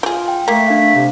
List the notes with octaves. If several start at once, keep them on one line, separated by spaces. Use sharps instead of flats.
F4 G4 G#4
G5
A3 A#3 B6
D4 F5
C3